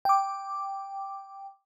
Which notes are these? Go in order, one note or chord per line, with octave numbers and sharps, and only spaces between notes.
G5 D6